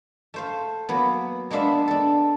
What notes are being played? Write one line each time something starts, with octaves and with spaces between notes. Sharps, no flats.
A3 C5 F5
F#3 A#3 B3
G#3 A#3 B3 D4 E5 F5
D4 A4